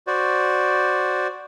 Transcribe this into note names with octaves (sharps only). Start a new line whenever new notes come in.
F#4 C5 D5